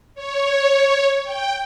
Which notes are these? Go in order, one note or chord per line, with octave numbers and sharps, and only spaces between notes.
C#5
G5